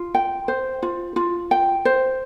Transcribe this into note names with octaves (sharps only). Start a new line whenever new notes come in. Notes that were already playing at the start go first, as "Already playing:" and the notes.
Already playing: F4
G5
C5
F4
F4
G5
C5